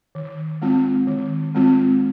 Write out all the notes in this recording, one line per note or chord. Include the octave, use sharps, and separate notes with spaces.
D#3
G#3 C4 F4
D#3
G#3 C4 F4